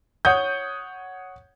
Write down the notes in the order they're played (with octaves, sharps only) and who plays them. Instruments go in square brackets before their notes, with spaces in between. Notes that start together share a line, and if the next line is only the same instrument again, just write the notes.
[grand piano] C#5 F#5 D#6 G6